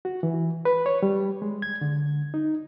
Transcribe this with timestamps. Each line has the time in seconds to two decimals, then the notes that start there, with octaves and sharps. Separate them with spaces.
0.05 F#4
0.23 E3
0.65 B4
0.86 C#5
1.03 G3
1.42 G#3
1.62 G#6
1.81 D3
2.34 D#4